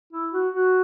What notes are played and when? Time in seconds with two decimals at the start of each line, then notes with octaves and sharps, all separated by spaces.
0.13 E4
0.33 F#4
0.53 F#4